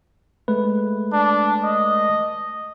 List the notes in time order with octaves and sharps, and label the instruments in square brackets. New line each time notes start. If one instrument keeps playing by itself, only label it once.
[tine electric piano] G#3 A3 B4
[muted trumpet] D4
D#5